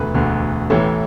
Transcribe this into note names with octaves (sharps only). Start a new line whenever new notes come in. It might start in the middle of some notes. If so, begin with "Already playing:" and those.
Already playing: E1 D2 D3 A4 B4
E1 D2 D3
A1 A2 E3 A4